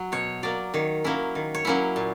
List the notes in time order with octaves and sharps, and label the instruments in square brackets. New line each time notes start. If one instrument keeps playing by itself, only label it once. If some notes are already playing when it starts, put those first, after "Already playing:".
Already playing: [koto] F#3
B2 C#5
F#3 A#3 D5
D#3 C#5
F#3 A#3 C#4 E4
D#3
C#5
F#3 A#3 C#4 E4
A#2